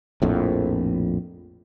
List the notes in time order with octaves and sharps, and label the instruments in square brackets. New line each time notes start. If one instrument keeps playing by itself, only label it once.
[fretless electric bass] A#1 F2 A2